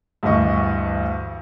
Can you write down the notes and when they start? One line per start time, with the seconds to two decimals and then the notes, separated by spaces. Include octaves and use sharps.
0.23 D2 G2 E3 D#5 C#6